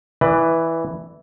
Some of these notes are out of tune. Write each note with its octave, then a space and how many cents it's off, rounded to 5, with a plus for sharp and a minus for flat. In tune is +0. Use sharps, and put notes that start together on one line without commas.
E3 -5 B4 +10 D5 +25